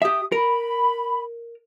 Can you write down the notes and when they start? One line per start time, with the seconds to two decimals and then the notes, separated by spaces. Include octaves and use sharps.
0.02 G4 E5 D#6
0.32 A#4 B5